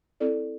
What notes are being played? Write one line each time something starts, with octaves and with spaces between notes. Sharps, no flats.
C4 E4 A4 D5